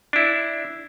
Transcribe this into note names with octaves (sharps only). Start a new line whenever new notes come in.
D4 E4